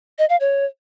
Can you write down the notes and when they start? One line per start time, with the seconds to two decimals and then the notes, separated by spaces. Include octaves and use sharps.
0.19 D#5
0.29 F5
0.40 C#5